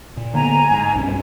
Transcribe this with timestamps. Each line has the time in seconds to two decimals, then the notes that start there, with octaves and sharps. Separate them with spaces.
0.17 A#2
0.34 D3 A#3 B3 G#5 A#5
0.71 G#2
0.94 B1 G2 C#4